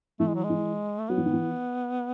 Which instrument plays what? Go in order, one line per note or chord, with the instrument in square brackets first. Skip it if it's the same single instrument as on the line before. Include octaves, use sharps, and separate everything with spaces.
[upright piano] E3 [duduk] A3
[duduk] G#3
F#3
G#3
[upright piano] E3
[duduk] A3
[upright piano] F#3 [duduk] B3
[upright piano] E3
D#3
E3